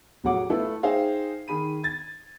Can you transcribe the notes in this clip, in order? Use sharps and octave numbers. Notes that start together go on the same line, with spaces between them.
F1 A2 F#3 G#4 F#5 D6
A3 E4 F4 A4 B4
D#4 G#4 C5 E5 F5 G5
D#3 G#4 B5 D#7
G#6 A6